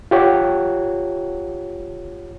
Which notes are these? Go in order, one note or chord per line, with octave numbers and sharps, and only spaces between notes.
F4 G4 C#5 F#5